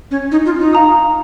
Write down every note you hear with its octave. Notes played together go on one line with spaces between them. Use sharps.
C#4
D#4
F4
D#4
F5 A#5 D#6